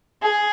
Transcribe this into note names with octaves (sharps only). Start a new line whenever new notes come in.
G#4